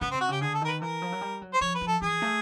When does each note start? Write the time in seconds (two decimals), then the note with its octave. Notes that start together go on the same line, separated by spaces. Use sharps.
0.01 C#3 B3
0.11 C4
0.15 C3
0.21 F#4
0.28 C#3 G4
0.41 D3 G#4
0.54 A4
0.61 D#3 A#4
0.67 B4
0.81 E3 A#4
1.02 F3
1.12 F#3
1.21 G3
1.42 F#3
1.54 C5
1.61 F3 C#5
1.74 B4
1.81 F3
1.88 A4
2.02 E3 G#4
2.22 A3